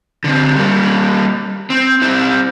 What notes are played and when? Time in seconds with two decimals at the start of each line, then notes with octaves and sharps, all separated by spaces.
0.24 D3 C4
0.55 G3 A#3
1.70 C4
2.02 C4 E4